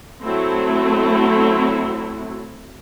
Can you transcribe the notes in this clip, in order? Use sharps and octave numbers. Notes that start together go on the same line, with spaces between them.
F#3 A3 C4 E4